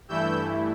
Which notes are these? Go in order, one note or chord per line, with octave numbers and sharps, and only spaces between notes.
G2 E3 A3 E4 E6 G6